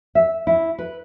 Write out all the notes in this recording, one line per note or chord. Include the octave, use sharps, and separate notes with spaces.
E5
E4
B4